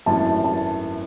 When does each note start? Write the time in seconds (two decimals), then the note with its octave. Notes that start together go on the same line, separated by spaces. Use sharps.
0.06 G#1 F#2 E3 A3 A5
0.44 A5